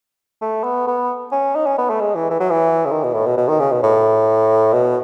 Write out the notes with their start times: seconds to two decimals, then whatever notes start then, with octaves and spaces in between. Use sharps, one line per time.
0.42 A3
0.64 B3
0.87 B3
1.32 C#4
1.55 D#4
1.66 C#4
1.78 B3
1.90 A3
2.01 G#3
2.15 E3
2.31 E3
2.40 F#3
2.51 E3
2.86 C#3
2.91 D#3
3.04 B2
3.14 A2
3.27 B2
3.37 B2
3.48 D#3
3.60 C#3
3.72 B2
3.83 A2
4.73 B2